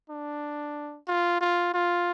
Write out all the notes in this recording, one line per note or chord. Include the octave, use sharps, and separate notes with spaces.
D4
F4
F4
F4